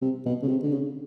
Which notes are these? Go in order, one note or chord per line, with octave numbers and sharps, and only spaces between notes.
C3
B2
C#3
C3
D3
C#3